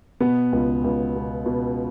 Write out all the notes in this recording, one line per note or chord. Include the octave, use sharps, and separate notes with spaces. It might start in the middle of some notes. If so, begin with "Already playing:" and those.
B2 B3
C#2
C#2
B2
B2